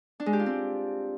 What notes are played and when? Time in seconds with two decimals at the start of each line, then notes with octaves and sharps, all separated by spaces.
0.20 D4
0.26 G#3
0.33 G4
0.40 F4
0.46 C4